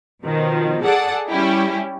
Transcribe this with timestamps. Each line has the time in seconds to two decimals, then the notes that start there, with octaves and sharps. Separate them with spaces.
0.25 B2 D#3 F3
0.82 G#4 A4 D5 F#5 A5
1.29 G3 C#4 E4 G4